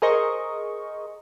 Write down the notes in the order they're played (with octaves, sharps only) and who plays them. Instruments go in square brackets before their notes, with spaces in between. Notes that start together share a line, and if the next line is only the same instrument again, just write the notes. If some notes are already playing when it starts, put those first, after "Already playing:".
[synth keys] G#4 A#4 C5 D#5 C#6